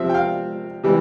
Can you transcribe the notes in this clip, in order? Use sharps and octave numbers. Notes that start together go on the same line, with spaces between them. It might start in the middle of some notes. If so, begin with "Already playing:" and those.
Already playing: C3 F3 C4 E5
G5
F5
C3 E3 G3